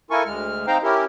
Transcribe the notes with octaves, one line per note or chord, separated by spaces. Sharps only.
E4 F4 A4 A#4 G#5 C#6
D2 G#3 F6
C4 D#4 C5 F5 G5 A#5
C#4 E4 G4 A#4